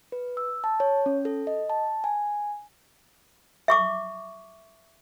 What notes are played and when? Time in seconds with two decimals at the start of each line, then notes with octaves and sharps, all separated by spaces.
0.12 B4
0.37 E6
0.64 A5
0.80 C#5
1.06 C#4
1.25 A4
1.47 D#5
1.70 A5
2.04 G#5
3.68 E5 C#6 D6